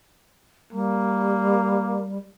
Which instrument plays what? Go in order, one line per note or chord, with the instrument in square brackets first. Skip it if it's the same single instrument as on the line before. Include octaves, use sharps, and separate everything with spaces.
[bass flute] G3 [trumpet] A#3